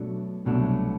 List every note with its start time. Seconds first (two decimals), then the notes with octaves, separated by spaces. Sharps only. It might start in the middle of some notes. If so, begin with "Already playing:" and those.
Already playing: B2 F#3 A3 D4
0.45 C2 B2 F#3 A3 D4